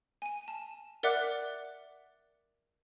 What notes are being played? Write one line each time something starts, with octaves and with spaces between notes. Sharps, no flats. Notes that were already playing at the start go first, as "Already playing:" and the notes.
G#5 D#7
A5
A#4 D5 E5 F#5 D6 F#6